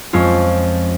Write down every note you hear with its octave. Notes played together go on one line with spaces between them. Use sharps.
F2 G#3 C#4 F4